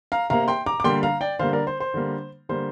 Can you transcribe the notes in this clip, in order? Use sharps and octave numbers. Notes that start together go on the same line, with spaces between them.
F5 A#5
C3 A#3 F5 A#5
G5 C6
A#5 D6
D6
D3 G3 A#3 G5 C6
F5 A#5
D5 G5
D3 G3 A#3 C5 F5
A#4 D5
C5
C5
D3 G3 A#3
D3 G3 A#3 C5